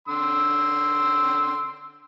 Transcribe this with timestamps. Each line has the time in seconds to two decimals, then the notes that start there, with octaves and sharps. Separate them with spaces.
0.08 D3 C6 E6